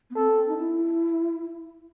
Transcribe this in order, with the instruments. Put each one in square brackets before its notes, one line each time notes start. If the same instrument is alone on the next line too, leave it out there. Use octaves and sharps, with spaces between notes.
[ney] B3
[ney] C4 [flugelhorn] A4
[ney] D#4
E4